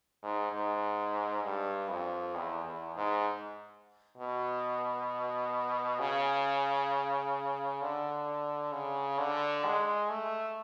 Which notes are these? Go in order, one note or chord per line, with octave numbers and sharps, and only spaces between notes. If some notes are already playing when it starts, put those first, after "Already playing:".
G#2
G#2
G2
F2
E2
E2
G#2
B2
C#3
D3
C#3
D3
G#3
A3